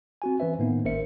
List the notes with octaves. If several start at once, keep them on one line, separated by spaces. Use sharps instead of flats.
C4 F#4 G#5
E3 C4 C#4 B4 C5 E5
A2 D#3 A#3 B3 D#4
G#1 C#4 A#4 C5 E5 C#7